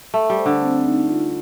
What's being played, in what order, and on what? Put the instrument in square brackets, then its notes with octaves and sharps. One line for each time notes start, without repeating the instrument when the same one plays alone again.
[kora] A3 [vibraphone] A4
[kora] G3
[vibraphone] C5
[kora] D3
[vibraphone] C4
D#4
F4